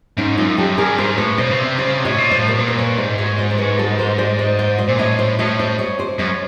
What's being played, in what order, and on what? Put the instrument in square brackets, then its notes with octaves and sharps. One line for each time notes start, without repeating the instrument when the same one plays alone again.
[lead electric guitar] G#2 [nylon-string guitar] C#4 D#4
[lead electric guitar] F#2 [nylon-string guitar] D#4 F4
[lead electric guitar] F#2 [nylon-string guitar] G4 A4
[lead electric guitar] G2 [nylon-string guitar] G#4 A#4
[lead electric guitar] G#2 [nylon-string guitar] A#4 C5
[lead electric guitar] A2 [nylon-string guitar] B4 C#5
[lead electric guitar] B2 [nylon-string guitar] C5 D5
[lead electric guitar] C#3
C3
[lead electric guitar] C#3 [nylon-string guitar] C5 D5
[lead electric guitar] C3
[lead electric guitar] A2 [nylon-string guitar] C#5 D#5
[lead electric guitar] A#2
[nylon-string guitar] C5 D5
[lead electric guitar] A2
[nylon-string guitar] A#4
[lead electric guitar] A#2 [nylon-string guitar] B4
[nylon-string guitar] C5
B4 C#5
[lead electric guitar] G#2 [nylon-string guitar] C5 D5
[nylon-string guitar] C#5 D#5
C5 D5
D5
B4 C#5
A4 B4
A#4 C5
C5 D5
C5 D5
C5 D5
C5 D5
[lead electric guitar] A#2
[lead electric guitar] A2 [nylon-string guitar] C#5 D#5
[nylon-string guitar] C5 D5
[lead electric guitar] A2 [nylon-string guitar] C#5 D#5
[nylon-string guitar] C5 D5
C#5 D#5
C5 D5
[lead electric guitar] F#2 [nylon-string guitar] C#5 D#5